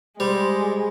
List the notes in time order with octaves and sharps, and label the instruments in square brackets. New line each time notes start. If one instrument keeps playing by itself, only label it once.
[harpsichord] G3 [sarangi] G#3 [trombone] C5